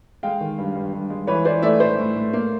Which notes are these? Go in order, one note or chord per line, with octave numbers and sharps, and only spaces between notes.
G#3 F5 G5
D#3
G2
G2
G2
G#3
E3 B4 C#5
E3 C5 D5
A3 D5 E5
A2 C5 D5
A2
A2
A#3